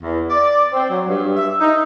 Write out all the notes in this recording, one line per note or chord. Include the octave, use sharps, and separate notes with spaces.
E2
D5
C4
F#3
G2
E5
D#4